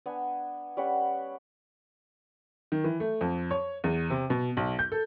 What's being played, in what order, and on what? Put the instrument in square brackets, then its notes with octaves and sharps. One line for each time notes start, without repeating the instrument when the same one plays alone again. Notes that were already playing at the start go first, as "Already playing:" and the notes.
[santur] B3 D4 G#5
G3 C#4 B4 F#5
[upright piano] D#3
E3
A3
F2
C#5
E2
C3
B2
B1
G6
A4